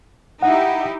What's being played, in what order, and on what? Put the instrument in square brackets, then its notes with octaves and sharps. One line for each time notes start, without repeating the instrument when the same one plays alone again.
[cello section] D#4 E4 G4 [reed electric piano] F#5